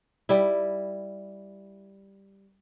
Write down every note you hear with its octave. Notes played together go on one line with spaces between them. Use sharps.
G3 E4